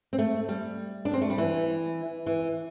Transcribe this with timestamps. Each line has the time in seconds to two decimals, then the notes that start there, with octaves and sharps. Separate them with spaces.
0.13 C4
0.19 A3
0.49 G3
1.05 D4
1.13 C4
1.21 A3
1.30 G3
1.38 E3
2.26 E3